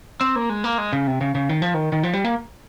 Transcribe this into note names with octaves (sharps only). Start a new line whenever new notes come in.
C4
A#3
G#3
A#3
G#3
C#3
C3
C#3
C#3
D#3
F3
D#3
D#3
F3
G3
A#3